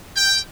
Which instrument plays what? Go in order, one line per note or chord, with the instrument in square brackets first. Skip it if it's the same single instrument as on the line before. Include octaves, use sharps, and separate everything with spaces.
[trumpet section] G5